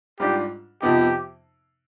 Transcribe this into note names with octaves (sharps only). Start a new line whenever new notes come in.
G#2 G3 D4 F4 G4
F2 C3 F3 B3 D#4 G4